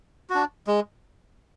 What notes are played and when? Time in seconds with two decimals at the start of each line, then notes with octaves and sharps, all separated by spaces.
0.30 D4 F#4
0.67 G#3